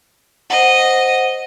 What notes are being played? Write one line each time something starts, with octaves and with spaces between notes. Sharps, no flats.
C5 D#5 F#5